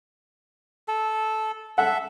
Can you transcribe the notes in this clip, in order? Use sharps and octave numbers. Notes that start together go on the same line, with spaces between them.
A4
A4 E5 F#5